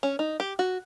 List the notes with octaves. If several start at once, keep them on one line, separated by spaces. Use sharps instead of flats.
C#4
D#4
G4
F#4